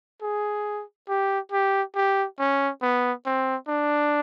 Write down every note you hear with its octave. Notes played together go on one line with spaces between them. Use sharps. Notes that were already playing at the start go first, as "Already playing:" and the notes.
G#4
G4
G4
G4
C#4
B3
C4
D4